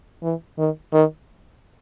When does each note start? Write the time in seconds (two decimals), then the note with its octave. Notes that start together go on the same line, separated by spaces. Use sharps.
0.23 E3
0.58 D#3
0.93 D#3